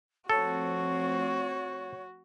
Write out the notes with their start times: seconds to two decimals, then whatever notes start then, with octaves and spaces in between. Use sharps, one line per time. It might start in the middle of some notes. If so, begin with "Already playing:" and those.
0.30 F3 A3 C4 F#4 A4 C#5